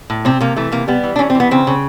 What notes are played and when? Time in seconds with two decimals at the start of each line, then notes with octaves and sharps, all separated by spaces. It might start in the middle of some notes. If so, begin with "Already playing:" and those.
0.10 A2
0.25 C3 C4
0.41 C3 A#3
0.57 E3 A3
0.72 C3 A#3
0.88 G3 B3
1.03 E3
1.16 D4
1.19 E3 C#4
1.30 C4
1.35 E3 B3
1.51 C#3 C4
1.67 C#3